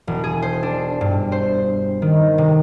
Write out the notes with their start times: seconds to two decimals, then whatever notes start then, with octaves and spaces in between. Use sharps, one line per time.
0.07 E1
0.24 G#4
0.42 C5
0.63 D4
1.01 G2
1.32 C5
2.02 D#3
2.38 C3